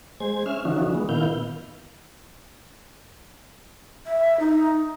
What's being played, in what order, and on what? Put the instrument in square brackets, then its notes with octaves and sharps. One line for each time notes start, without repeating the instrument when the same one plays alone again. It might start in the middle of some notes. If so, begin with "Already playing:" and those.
[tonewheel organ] G#3 C5 G#6
C#4 E5 F6
D3 E3 F3 C#4 D#4 F#4
G#3 B3
A#2 D#3 B3 E4 F5 G6
[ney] E5
D#4